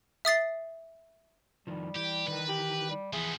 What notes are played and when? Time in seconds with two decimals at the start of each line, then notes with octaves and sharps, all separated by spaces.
0.25 E5 D#6 A6 C7
1.67 F2 D#3 F3 G3
1.96 E3 G4
2.28 D#3 E3 A#4 B4
2.49 G4
2.90 G3
3.13 E3 F3 B3 G#4 E5